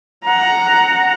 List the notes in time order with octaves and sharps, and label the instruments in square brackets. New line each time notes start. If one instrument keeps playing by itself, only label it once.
[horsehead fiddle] F#5 A#5